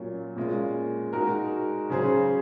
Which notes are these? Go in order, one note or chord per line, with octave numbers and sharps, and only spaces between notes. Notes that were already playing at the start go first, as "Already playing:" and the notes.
Already playing: A#2 F#3 C#4 F4
A#2 G#3 C#4 F4
G#3 D#4 F#4 A#4
C#3 F#3 C#4 G#4 C5